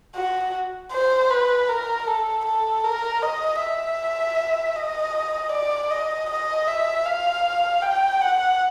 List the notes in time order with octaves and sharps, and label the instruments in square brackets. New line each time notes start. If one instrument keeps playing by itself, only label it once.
[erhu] F#4
C5
B4
A#4
A4
A4
A#4
D#5
E5
D#5
D5
D#5
D#5
E5
F5
G5
F#5